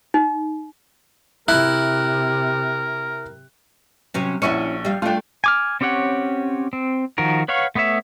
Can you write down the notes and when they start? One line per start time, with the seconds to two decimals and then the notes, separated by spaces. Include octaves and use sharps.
0.14 D#4
1.48 C3 E4 A#4 F#6
4.14 C3 F#3 C#4
4.42 A#1 C#4 E4 F#4 C#6 C#7
4.85 G3 F5
5.02 A3 D4 F4 G5
5.44 G#5 D6 F6
5.81 C4 C#4 G4 C#5 F#5
6.73 C4
7.18 D#3 F3 F#4 A#4
7.48 B4 C#5 F5 F#5 C#6
7.75 A3 B3 B4 C#5 E5